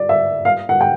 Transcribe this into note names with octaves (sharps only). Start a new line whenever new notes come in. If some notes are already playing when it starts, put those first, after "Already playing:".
Already playing: D5
E5
F5
F#5
G5